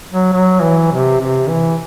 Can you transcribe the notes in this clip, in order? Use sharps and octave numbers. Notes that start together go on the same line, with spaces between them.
F#3
F#3
E3
C3
C3
E3